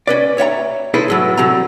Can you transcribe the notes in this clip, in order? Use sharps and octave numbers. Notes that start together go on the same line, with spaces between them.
C#4 B4 D5
C#5 E5 F#5 A#5
E4 G#4 A4 B4 C5 E5
E2 A2 F#3
D3 F#3 C4 A#5